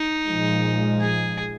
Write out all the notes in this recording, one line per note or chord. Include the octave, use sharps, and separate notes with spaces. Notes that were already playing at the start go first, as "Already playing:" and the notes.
Already playing: D#4
A#2 F3 G#3
G#4